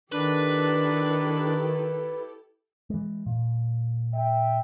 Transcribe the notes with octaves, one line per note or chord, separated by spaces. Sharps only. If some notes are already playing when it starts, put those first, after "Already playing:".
D#3 D4 E4 G4 A4 B4
E3 G#3
A#2
E5 G5